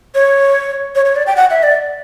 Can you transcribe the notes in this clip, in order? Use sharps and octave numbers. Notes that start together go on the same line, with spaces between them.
C#5
C#5
C#5
D5
G5
F#5
E5
D5